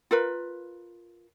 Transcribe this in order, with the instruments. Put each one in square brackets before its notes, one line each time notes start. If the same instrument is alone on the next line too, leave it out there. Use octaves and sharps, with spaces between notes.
[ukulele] F4 A#4 B4